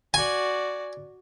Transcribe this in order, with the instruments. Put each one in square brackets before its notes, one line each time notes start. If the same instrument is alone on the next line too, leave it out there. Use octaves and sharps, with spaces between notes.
[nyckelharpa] F#4 D5 [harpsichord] G#5